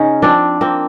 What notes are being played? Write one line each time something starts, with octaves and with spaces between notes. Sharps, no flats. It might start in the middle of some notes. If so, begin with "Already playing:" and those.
Already playing: C#3 C#4 D#4
F3 C4 D4
F3 A#3 C4